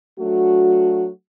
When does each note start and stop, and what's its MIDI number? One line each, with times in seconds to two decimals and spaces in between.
0.19 1.08 54
0.19 1.08 57
0.19 1.08 62
0.19 1.08 66